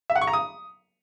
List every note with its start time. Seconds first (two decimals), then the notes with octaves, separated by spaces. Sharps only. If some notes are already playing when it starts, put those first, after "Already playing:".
0.10 E5
0.16 F#5
0.21 C#6
0.27 A#5
0.33 D#6